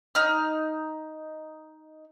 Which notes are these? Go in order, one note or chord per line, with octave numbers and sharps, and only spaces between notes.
D#4 F6